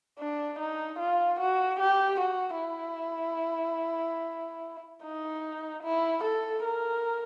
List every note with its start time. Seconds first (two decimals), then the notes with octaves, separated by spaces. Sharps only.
0.19 D4
0.59 D#4
0.99 F4
1.40 F#4
1.80 G4
2.20 F#4
2.61 E4
5.04 D#4
5.83 E4
6.25 A4
6.64 A#4